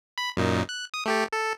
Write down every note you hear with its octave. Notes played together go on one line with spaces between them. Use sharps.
B5
F#2 A#2 D#4
F#6
D#6
A3 G4 A4
A4